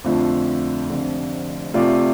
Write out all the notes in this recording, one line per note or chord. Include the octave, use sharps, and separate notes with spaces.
F2 D3 A3 F4
F1 F2 D3
C3 A3 F4 D5